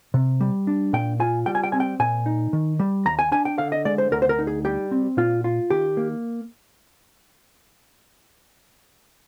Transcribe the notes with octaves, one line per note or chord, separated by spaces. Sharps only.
C3
G3
D4
A#2 G5
F4 G#5
G3 G5
G#5
G5
C4 G#5
G5
A#2 G#5
D#4
D#3
G3
D#2 A#5
G#5
D4 G#5
G5
D3 F5
D#5
G#3 D5
C5
D2 A#4
C5
A#4
D#4
G#4
G3 G4
C4
A#2 F4
F4
D#3 G4
A#3